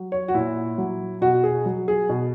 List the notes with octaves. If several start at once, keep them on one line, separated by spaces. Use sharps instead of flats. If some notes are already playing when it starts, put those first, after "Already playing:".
Already playing: F#3
C#5
F#4
A#2 E4
F#3
B2 F#4
G#4
F#3
G#4
B2